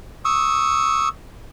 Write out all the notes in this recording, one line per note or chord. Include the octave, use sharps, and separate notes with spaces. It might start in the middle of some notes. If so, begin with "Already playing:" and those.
C#6 D#6 E6